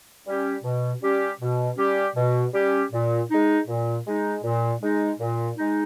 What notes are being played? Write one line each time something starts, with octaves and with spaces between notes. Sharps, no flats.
G3 C#4 G4
B2
G3 C#4 G4
B2
G3 C#4 G4
B2
G3 C#4 G4
A#2
G#3 D#4
A#2
G#3 D#4
A#2
G#3 D#4
A#2
G#3 D#4